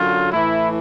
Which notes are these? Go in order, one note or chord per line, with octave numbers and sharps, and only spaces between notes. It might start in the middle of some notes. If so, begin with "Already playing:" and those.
Already playing: F#2 D3 F#3 F4
A2 E3 E4